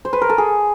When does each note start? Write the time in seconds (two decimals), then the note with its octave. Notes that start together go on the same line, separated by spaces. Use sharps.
0.05 C5
0.13 B4
0.22 A#4
0.30 A4
0.38 G#4